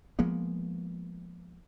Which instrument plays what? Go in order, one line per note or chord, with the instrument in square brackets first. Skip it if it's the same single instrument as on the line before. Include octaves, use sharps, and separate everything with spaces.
[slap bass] F3 G#3 A#3 B3